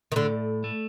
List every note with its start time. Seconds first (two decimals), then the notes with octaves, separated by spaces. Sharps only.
0.12 D#3
0.16 A2 D3
0.64 A3